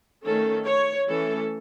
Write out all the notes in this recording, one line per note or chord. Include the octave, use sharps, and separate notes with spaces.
D#3 A3 C#4 A4
C#5
E3 A3 C#4 A4